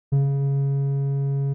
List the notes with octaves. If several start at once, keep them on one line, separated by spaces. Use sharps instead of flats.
C#3